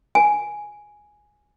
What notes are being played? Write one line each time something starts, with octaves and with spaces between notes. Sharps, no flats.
G#5